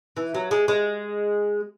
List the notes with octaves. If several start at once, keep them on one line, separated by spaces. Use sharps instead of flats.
E3
F#3
G#3
G#3